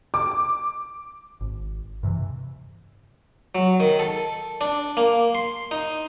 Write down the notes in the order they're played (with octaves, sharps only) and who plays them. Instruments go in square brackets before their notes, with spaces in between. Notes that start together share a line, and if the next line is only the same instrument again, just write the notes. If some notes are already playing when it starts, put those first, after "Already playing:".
[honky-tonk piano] D6
[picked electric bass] G#1
G2 C3 E3
[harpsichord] F#3
D#3
A4
D4
A#3
C6
D#4